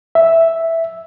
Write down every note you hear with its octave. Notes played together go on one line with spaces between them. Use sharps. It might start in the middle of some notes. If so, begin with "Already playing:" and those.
E5